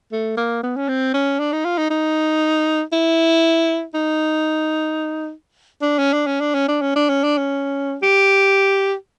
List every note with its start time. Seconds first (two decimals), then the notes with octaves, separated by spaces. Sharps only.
0.12 A3
0.37 A#3
0.63 B3
0.76 C#4
0.88 C4
1.14 C#4
1.40 D4
1.52 D#4
1.65 F4
1.78 D#4
1.90 D#4
2.93 E4
3.94 D#4
5.82 D4
5.99 C#4
6.13 D4
6.27 C#4
6.40 D4
6.54 C#4
6.68 D4
6.82 C#4
6.96 D4
7.09 C#4
7.24 D4
7.38 C#4
8.02 G4